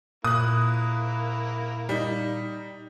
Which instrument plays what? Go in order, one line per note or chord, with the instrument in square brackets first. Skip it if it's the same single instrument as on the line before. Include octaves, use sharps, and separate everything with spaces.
[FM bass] A#2 [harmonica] A#3 E4 [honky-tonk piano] D#6 F#6
[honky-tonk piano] G3 D#4